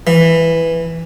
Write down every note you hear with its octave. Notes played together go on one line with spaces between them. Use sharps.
E3